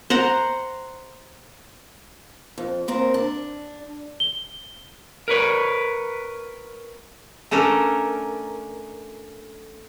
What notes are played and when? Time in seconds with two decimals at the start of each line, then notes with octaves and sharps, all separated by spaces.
0.10 C5 F#5 A#5
2.58 F2
2.88 D#2 C4 A#4
3.14 D4
4.20 G7
5.28 A#4 B4 C#5
7.51 A3 C#4 D4 A4 A#4